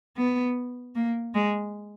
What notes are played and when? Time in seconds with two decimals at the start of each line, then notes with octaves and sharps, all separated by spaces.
0.17 B3
0.95 A#3
1.35 G#3